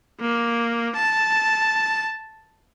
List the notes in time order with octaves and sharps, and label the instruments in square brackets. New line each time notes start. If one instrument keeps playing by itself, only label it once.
[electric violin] A#3
A5